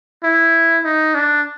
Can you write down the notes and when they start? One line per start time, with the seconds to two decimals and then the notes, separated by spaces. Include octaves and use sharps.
0.24 E4
0.84 D#4
1.14 D4